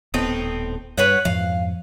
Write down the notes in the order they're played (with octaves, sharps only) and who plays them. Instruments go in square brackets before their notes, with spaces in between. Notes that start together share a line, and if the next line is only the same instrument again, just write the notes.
[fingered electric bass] D#1 B3 [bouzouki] A2 C4 D#4
[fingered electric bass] G2 [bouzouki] B4 C#5 F#5
[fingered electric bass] F2 G#2 F3 [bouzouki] F5